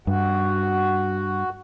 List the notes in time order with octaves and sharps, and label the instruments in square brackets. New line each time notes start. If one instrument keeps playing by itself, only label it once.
[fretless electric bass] G2 [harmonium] F#4